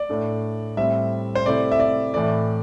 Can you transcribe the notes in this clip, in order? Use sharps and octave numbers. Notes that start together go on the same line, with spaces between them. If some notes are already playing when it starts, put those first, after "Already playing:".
Already playing: D5
A2 A3 D4
A2 G3 C4 E5
C5
C3 A3 E4 D5
E5
D5
A2 E3 A3 D5